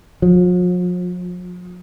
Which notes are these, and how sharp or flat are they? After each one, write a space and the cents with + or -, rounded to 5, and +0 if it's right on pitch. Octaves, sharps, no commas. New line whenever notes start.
F3 +45